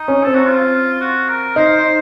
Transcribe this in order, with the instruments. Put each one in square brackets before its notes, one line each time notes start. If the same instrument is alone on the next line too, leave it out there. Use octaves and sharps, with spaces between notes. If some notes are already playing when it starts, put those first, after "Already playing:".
Already playing: [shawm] D#4
[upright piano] C#4
[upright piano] C4 [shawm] A4
[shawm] F#4
F4
F#4
A#4
[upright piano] D#4 [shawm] C5
[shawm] C5